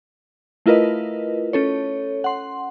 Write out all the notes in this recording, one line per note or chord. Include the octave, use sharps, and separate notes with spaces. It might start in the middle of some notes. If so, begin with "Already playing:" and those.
A3 E4 F4 A#4 B4 D#5
C#4 A4 C#5
F#5 C6